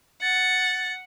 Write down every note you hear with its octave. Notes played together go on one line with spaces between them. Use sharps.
F#5 A6